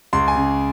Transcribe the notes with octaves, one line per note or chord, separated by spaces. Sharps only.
C#2 C6
G#5
C#3